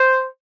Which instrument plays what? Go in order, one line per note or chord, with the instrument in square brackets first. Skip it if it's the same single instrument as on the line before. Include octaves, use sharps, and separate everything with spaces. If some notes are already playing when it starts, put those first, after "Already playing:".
Already playing: [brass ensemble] C5